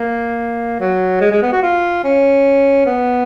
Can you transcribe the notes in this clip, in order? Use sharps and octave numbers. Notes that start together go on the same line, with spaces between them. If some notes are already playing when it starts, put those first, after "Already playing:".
Already playing: A#3
F#3
G#3
G#3
B3
F#4
F4
C#4
B3